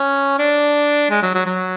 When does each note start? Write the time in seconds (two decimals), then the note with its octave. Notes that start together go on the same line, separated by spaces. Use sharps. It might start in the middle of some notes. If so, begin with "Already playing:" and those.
Already playing: C#4
0.39 D4
1.10 G#3
1.23 F#3
1.34 F#3
1.46 F#3